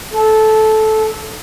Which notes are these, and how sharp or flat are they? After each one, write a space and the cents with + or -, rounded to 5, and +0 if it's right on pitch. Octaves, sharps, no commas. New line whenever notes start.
A4 -15